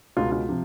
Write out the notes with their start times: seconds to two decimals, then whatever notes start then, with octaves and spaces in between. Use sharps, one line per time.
0.17 C#2 B2 G#3 F4
0.32 F4
0.49 C3 F3